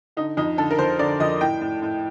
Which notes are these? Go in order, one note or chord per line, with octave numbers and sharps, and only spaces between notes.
D3 D#4
F2 D#4
D3 A4
A#4
F2 C5
D3 D5
F2 D#5
A2 G5
A2
A2